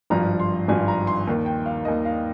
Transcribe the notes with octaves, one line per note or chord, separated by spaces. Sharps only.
G#1 G2 F3 A#5
C6
G#1 G2 F3 G#5
A#5
C6
D#2 D#3
G5
F5
D#2 D#3 D#5
F5